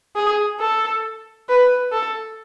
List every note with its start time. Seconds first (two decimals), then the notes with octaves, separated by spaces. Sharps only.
0.16 G#4
0.60 A4
1.49 B4
1.92 A4